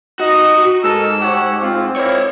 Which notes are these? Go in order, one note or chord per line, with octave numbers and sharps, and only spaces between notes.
D#4 F#4 D#5
G#2 A4 A#4 D#5 E6
G4 C#5 F#5
C4 F4
E4 F4 A#4 C5 C#5